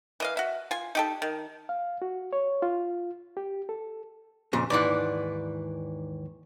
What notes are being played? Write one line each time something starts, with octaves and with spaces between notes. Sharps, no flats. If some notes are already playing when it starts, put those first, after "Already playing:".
E3 D#5 F5
F#4 E5
F4 G#5
D#4 G4 A4
D#3
F5
F#4
C#5
F4
G4
A4
F2 A#2 C#3
D#2 G#2 E3 D5 F#6